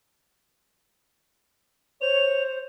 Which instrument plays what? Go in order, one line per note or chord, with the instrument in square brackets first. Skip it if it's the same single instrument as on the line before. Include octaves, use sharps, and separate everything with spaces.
[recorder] C5 [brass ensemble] C#5 [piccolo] F7